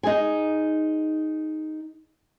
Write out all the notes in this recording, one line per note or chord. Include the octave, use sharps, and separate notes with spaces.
D#4 G#4 G#5